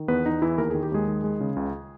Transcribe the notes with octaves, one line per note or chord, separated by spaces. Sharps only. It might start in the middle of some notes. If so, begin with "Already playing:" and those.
Already playing: D#3
E2 B3 B4
E2 D#4
E2 E3 E4
D#2 A#4
D#3 G#4
G4
D#2 G#3 G#4
D#3
G#3
C#3
C#2